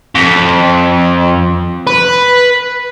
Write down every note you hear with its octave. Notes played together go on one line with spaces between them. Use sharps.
F2
B4